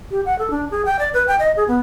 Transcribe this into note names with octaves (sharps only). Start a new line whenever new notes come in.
G4
F#5
A4
D4
G#4
G5
D5
B4
G5
D#5
G#4
B3